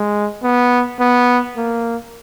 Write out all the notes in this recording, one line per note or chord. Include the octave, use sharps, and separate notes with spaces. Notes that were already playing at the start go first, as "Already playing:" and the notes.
Already playing: G#3
B3
B3
A#3